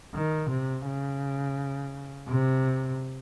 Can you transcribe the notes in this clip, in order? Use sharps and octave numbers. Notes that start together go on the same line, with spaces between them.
D#3
C3
C#3
C3